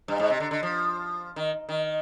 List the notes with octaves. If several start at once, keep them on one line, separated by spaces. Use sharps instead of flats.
G2
G#2
C3
D3
D3
F3
D#3
D#3